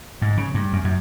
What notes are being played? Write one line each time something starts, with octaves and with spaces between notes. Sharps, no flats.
G#2
C#3
G2
F#2
F#2